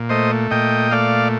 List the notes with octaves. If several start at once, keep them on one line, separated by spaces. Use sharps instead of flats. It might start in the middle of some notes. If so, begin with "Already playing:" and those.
Already playing: A#2
A3 C5 D#5
A#2 D#5 G5
A3 D5 F5